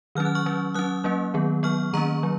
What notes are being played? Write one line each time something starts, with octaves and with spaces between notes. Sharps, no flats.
D#3 F#3 C#4 F6
F#6
C#6 F6
F#3 C#4
F#3 C#4 D#6 F#6
F#3 A#3 C#4
D#3 F#3 B3
F#3 B3 C#6 F6
D#3 A#3 C#4 A#5 C#6
F#3